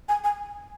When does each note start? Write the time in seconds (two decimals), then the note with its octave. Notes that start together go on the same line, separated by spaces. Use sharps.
0.09 G#5
0.24 G#5